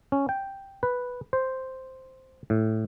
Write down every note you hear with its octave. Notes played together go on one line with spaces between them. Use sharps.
C#4
G5
B4
C5
A2